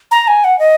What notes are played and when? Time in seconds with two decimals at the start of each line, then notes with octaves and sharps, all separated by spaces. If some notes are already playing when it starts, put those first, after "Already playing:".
0.11 A#5
0.28 G#5
0.44 F#5
0.59 D#5